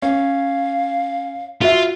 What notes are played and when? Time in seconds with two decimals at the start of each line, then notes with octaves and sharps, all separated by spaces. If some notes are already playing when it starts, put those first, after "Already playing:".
0.02 C#4 F5
1.61 F4 F#4 E5